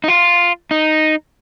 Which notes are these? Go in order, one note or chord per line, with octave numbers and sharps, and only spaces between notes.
D#4
F4
D#4